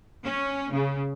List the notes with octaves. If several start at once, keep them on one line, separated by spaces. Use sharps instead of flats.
C#4
C#3